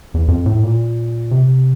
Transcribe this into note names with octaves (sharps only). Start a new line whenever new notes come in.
E2
F2
A2
A#2
C3